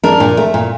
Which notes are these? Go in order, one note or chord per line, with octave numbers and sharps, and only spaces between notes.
D4 A#4
A#2
A3
A#2